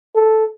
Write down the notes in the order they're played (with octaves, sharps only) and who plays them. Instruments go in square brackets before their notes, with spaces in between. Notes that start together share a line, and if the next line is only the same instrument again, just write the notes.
[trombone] A4